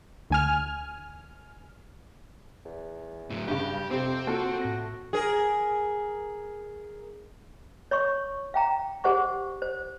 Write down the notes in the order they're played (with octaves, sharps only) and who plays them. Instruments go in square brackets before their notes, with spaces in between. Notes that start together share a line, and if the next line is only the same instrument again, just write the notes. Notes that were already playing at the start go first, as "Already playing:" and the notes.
[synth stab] D2 G#5 F6
[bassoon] E2
[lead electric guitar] A2 F#3
[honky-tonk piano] G2 C#3 [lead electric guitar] G4
[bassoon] F2 [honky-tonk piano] C3 [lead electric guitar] C4
[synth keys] A#3 F4 [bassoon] F#4 [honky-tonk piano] A4
[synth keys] A2 A#6
[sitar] G#4 A#4
[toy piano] C#5 C6 C#6
F5 G5 A#5
G4 G#4 C5 F#5 C#6
C5